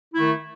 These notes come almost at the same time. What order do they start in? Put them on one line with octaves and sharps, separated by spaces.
E4 A3 D#3